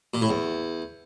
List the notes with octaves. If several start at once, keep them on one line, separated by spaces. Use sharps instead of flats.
A#2
A2
E2